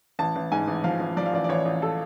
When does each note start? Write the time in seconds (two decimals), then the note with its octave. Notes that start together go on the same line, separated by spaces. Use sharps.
0.19 A1 A5
0.36 A1
0.52 G#2 G#5
0.68 A1
0.84 F3 F5
1.00 A1
1.17 F3 D5
1.26 F5
1.33 A1 D5
1.44 D5
1.49 A1 C#5
1.65 A1
1.82 A4